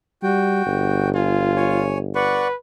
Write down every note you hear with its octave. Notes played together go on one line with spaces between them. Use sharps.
G3 F#4 G5
G1
F4 G#5
C#5 G#5
B4 D5 F#5 C#6